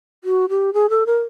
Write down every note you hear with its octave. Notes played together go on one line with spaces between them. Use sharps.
F#4
G4
G#4
A4
A#4